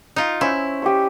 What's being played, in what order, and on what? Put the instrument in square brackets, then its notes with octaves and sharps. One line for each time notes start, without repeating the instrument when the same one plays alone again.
[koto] D#4 F4
[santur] C#4 C5 E6 [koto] E4
[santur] G4 D#5 C#6